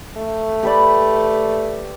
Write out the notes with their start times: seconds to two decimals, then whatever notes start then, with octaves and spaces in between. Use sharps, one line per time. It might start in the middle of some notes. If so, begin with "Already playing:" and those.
0.17 A3
0.63 G4 B4 D5